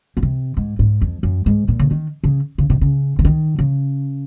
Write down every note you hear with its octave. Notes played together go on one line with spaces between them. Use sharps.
A#2
C3
G#2
G#2
F2
F#2
G#2
A#2
C#3
D#3
C#3
C#3
C3
C#3
C#3
D#3
C#3